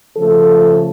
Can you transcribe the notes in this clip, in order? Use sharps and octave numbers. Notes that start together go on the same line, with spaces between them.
C#3 F3 A3 A4